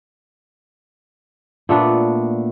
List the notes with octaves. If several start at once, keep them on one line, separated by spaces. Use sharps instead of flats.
A#2 A3 B3 D4